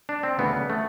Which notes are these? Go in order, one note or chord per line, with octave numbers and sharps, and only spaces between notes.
D4
C4
D2 C#3 E3 B3
A3